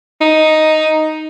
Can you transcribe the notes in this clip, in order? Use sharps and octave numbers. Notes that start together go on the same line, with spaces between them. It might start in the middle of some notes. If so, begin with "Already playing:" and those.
D#4